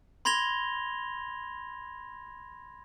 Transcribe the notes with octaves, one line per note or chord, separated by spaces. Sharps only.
B5 C6 G#6 A#6 F7 G7